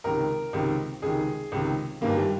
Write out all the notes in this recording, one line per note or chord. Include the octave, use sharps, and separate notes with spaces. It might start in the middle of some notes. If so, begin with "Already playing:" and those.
C#2 C3 D#3 A#4
C#2 C3 D#3
C#2 C3 D#3 G#4
C#2 C3 D#3
G1 G2 D#3 A#3
G3